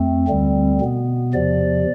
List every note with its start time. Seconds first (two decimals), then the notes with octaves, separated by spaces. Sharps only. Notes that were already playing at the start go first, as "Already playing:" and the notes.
Already playing: F2 A3 C4
0.28 D2 D3 G3 C4
0.81 B2 B3
1.34 E2 C3 F3 D5